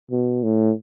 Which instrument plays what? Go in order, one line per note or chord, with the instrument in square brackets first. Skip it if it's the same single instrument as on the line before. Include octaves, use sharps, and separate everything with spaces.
[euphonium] B2
A2